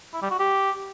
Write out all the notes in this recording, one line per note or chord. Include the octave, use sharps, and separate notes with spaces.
E4
G3
F#4
G4